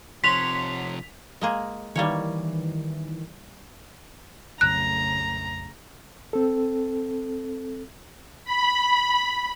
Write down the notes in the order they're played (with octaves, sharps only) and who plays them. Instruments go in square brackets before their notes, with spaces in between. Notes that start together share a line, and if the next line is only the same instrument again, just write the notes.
[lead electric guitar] C3 F3 [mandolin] C#5 F#5 C6 [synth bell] B6 F7
[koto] G#3 A#3 G#4
[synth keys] D#3 E3 [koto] G3 A#3 C#5
[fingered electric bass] A#1 F2 F#3 [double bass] C#3 A3 [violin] A#5 [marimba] F#6
[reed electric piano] C4 A4
[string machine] B5